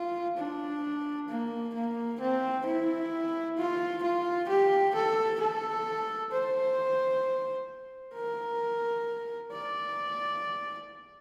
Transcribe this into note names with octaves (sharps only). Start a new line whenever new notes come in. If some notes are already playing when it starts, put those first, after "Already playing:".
Already playing: F4
D4
A#3
A#3
C4
E4
F4
F4
G4
A4
A4
C5
A#4
D5